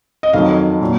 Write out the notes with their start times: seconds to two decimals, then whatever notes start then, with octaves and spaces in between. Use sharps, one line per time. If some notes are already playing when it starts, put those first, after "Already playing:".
0.23 D#5
0.33 F2 D#3 F#3 F5
0.81 A#2 F#3